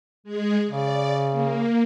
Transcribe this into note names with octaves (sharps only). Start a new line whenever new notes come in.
G#3 G#4
C#3 D5
A#3